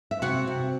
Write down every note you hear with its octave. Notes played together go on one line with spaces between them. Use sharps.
E5
C3 F#4 F#5
C3